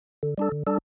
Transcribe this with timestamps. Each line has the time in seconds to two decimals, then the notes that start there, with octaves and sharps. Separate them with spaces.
0.23 D3
0.38 G3 D4 A4
0.52 D3
0.67 G3 D4 A4